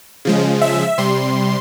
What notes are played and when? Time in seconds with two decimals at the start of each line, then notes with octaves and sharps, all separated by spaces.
0.25 C#3 F3 G#3
0.62 E5
0.98 C3 G3 C6